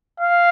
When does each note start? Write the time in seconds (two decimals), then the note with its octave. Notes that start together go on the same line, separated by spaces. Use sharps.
0.20 F5